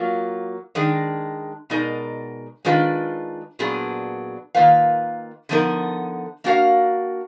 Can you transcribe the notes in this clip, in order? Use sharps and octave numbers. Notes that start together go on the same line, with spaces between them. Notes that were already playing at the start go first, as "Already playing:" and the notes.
Already playing: F#3 A#3 F4
D#3 G#3 D4
B2 G#3 D#4 A#4 D5
D#3 G#3 D4 F4 B4
A#2 F#3 B3 D4 G#4
D#3 A#3 F4 B4 F5
D3 F3 B3 D#4 A#4
A#3 D4 F#4 A#4 F5